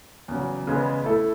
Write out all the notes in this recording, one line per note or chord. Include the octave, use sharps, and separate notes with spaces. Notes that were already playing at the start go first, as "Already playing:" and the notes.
E2 C#3 F#3
E2 C#3 G#3 B3
A3 E4 A4